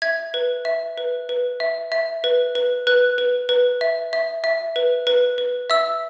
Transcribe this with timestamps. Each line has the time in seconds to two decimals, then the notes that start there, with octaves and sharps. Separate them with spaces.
0.02 E5 G#6
0.34 B4
0.65 E5
0.98 B4
1.29 B4
1.60 E5
1.92 E5
2.24 B4
2.55 B4
2.87 B4 F#6
3.18 B4
3.49 B4
3.81 E5
4.13 E5
4.44 E5
4.76 B4
5.07 B4
5.38 B4
5.70 E5 E6